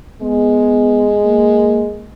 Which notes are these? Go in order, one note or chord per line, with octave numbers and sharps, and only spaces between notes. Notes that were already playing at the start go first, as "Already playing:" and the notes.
G#3 B3
A#3